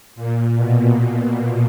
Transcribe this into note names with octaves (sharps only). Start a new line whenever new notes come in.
A#2
B2